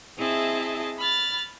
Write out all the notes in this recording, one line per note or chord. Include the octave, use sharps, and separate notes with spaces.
C4 E4 G#4 D#5 E5 A5
B5 F6 A6